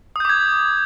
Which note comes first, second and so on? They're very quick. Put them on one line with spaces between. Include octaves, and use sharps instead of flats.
D#6 G6 D6 G#6